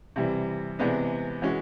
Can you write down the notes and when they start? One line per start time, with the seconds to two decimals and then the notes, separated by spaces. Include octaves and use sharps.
0.16 C3 E3 G3
0.79 C3 E3 G#3 B3 D4
1.42 E3 G#3 C#4 F#4